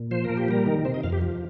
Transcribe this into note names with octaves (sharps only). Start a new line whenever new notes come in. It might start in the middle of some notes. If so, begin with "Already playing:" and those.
Already playing: A#2
F3 C5
A#4
A#2
G4
G3 A#4
D#3
C3 C5
D#5
F2 F5
G4
F3